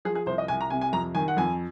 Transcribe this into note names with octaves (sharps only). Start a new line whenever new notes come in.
F3 G#4
G#4
C2 C5
D#5
C2 G#5
A#5
C3 G#5
G#5
F2 A#5
D#3 G#5
F#5
F2 G#5